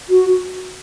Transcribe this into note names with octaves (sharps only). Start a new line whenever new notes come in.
F#4